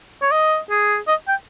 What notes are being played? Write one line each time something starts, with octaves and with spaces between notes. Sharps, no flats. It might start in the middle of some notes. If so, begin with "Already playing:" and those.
C#5
D#5
G#4
D#5
G5